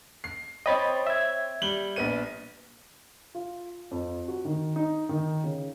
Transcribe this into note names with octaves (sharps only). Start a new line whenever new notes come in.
C7
C4 C#5 D#5 G5 B5 A6
E5 G#6
G3 F#7 G7
A#1 B3 D#7
F4
F2
F#4
D#3
D#4
D#3
C#3